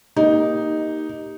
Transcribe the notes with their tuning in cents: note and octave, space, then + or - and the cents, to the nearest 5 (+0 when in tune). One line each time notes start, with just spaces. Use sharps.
A#3 +0 D#4 +0 G4 +0